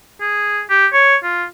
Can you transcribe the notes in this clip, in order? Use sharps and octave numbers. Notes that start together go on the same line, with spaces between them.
G#4
G4
C#5
F4